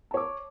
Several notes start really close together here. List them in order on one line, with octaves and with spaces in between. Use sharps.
A5 C#5 D6